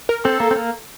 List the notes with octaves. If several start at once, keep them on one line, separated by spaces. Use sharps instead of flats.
A#4
C4 A4
A#3
C4
A#3